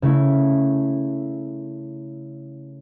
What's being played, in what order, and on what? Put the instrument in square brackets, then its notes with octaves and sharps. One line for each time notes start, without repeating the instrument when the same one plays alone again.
[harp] C#3 A3 E4